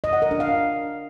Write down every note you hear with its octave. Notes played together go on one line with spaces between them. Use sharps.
D#5
F#5
A#4
D4
F5